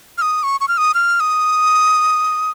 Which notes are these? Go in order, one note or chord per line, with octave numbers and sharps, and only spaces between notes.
F6
D#6
C#6
C#6
F6
D#6
F6
D#6